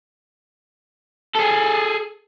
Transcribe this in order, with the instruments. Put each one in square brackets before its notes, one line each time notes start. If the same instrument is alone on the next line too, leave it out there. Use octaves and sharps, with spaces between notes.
[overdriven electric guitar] G#4 A4